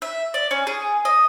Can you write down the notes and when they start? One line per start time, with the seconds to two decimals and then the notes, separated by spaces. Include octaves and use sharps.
0.02 E5
0.34 D5
0.51 C#4
0.67 G#4
1.05 D#5